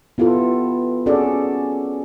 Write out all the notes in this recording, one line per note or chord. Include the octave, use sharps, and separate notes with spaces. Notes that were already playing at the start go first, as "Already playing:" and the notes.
B3 E4 F4 G4 A4
C4 C#4 F#4 G#4 A4 D5